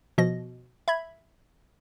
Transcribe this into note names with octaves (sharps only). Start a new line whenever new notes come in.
B2 F3 D#5 A#6
E5 B5 G#6